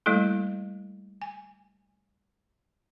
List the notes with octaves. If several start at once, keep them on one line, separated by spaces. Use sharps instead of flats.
G3 A3 A#3 E4 A4
G#5